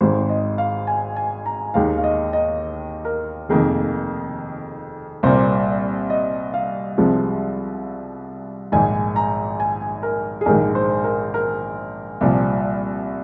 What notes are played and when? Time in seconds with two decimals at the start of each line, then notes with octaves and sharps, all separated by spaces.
0.01 G#1 G#2 G#3 C5
0.29 D#5
0.58 F5
0.87 G#5
1.16 G#5
1.46 A#5
1.74 D#2 D#3 G#3 F5
1.98 F5
2.04 D#5
2.33 D#5
3.05 A#4
3.49 F1 F2 D#3 A#3 G#4
5.23 C2 A#2 A#3 C5
6.10 D#5
6.54 F5
6.98 C2 C3 F3 G#3
8.72 A#1 G#2 D#3 G#5
9.16 A#5
9.60 G#5
10.03 A#4
10.41 G#4
10.46 A#1 G#2 D#3 G#3 A#4
10.75 C5
11.04 A#4
11.34 A#4
12.21 C2 A#2 F3